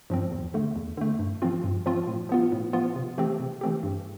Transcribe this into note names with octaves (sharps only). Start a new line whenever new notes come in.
G2 F3 C4
E2
D3 A3
E2
D3 A3
G2
F3 C4 F4
G2
F3 C4 F4
A2
F3 B3 F4
A2
F3 B3 F4
C3
E3 A3 C4 G4
C3
E3 A3 C4 G4
G2